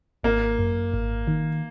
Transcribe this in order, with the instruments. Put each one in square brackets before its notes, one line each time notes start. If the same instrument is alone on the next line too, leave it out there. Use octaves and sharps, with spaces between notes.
[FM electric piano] G#1 [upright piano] A#3
[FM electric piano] F#2
G#1
D#3